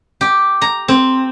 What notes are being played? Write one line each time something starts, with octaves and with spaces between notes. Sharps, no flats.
G4
A#5
C4